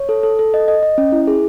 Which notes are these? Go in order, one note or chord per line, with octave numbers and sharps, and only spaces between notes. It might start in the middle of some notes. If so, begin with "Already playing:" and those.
Already playing: C#5
A4
A4
A4
D#5
D#5
D#5
C#4
E4
G#4